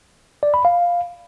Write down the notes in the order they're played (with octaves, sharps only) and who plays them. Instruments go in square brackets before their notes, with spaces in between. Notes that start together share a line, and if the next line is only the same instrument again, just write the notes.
[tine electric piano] D5
B5
F5